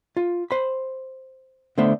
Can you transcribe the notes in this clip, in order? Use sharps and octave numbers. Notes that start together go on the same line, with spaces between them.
F4
C5 B5
D3 A3 B3 C5 E5